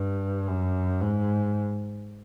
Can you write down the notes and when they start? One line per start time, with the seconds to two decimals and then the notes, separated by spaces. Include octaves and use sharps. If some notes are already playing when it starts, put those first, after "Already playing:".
Already playing: G2
0.48 F#2
1.01 G#2